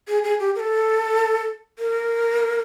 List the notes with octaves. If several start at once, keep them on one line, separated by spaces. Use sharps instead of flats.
G#4
G#4
G4
A#4
A4
A#4